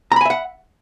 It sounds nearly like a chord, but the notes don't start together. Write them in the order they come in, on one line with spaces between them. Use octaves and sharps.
A#5 B5 G#5 E5 F#5